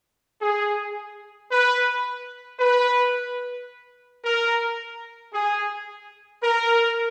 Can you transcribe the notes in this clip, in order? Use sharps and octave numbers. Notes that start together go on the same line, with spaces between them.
G#4
B4
B4
A#4
G#4
A#4